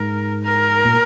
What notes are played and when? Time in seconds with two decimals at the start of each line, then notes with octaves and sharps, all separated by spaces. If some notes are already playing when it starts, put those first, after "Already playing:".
Already playing: G#2 A#4
0.43 A#4
0.85 A#2